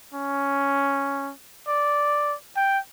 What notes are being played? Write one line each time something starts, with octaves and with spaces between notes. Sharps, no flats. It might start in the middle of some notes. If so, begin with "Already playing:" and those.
C#4
D5
G5